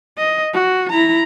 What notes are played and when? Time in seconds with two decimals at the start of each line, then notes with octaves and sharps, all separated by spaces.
0.18 D#5
0.54 F#4
0.90 E4 A#5